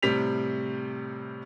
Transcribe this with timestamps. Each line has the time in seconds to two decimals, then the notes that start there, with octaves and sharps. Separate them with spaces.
0.02 A2 C3 G3 B6 F7